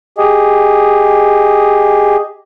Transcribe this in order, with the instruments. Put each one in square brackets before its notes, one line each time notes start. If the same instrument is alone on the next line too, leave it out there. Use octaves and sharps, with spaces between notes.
[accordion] G4 G#4 D#5